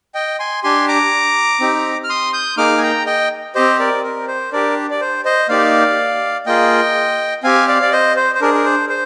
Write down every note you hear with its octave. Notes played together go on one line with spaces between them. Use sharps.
D#5 G5
G#5 C6
D4 G4 G#5 C6
A#5 D6
C4 D#4 G4
F6
C6 D#6
D#6 G6
A#3 D#4 G#4 D6 F6
G#5
G5 A#5
D#5 G5
C4 G4 C5 D#5
A#4 D5
A#4
C5
D4 G4 A#4 D5
D5
C5
C5 D#5
A#3 D#4 G4 D5 F5
A#3 F4 G#4 D#5 G5
C4 G4 F5 G#5
D5 F5
D5
C5 D#5
C5
C5
D4 G#4 A#4
A#4
C5
C5